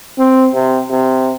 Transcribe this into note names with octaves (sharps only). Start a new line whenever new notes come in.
C4
C3
C3